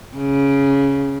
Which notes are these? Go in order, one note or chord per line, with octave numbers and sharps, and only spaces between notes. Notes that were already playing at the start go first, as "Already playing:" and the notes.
C#3